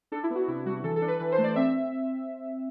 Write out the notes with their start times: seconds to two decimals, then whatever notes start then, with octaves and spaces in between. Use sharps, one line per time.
0.12 D4 A4
0.23 E4
0.30 B3
0.35 F#4
0.48 C3 E4
0.66 G3 F#4
0.84 E3 A4
0.96 A4
1.02 D4
1.08 B4
1.20 E3 B4
1.32 C5
1.38 A3
1.44 D5
1.56 C4 E5